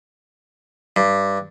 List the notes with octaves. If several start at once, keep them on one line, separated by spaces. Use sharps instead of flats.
G2